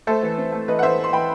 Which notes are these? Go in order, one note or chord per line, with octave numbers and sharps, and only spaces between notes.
A3 A4 C5
E3
C4
A3
E3 B4 D#5
F#5
E3 C5 E5
E3
C6
E3 G5 B5